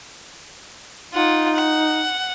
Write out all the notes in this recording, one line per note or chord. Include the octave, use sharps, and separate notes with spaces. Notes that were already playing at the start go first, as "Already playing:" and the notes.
D#4 F4 F#5
F#5